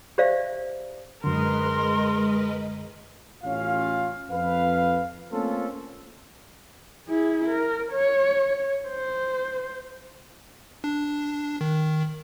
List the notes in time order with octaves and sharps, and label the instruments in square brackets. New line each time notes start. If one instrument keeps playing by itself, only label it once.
[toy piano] G4 C5 D5 E5 F5
[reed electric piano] F#2 D3 [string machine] G#3 B4 D#5 [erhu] A#4 [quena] C6
[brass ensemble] A1 C#4 F4 F5
F2 B4 F5
A3 A#3 C4 C#4 F4 A4
[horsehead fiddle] E4 G#4
A#4
C#5
C5
[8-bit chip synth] D4
D#3